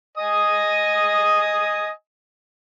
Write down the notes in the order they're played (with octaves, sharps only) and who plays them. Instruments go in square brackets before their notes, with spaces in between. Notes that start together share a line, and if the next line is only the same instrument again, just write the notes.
[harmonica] D#5 G#5 D#6